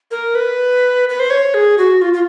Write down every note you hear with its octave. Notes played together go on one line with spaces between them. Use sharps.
A#4
B4
B4
C5
C#5
G#4
F#4
F4
F4